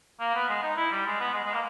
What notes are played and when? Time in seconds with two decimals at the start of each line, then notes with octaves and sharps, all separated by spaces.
0.20 A#3
0.35 B3
0.49 G#3
0.63 D#4
0.77 E4
0.92 G3
1.06 G#3
1.20 B3
1.34 G#3
1.44 G#3
1.54 A#3